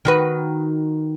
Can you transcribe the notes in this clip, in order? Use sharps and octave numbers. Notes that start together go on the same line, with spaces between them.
D#3 F#4 B4